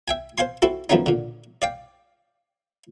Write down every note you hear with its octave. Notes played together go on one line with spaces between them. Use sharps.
E5 G5 G#5
C5 F5 G#5 C6
C4 E4 F#4 A4
F#2 F3 A3 B3 C#4 D#4
A#2 D3
D5 F5 G5